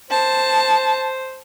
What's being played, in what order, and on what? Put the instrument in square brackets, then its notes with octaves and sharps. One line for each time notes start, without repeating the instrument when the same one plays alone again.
[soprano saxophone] C5 [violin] A5